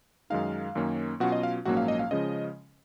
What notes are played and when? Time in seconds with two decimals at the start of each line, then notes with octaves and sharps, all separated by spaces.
0.30 F#2 D#3 G#3 D#4 F5
0.75 F#2 D#3 A#3 C#4
1.20 B2 F#3 C#4 F4 F#4 F#5
1.32 D#5
1.43 F5
1.65 A#1 G#2 F#3 A#3 C#4 F#4 F#5
1.77 F5
1.88 D#5
1.99 F5
2.11 C#3 F3 G#3 C#4 D#5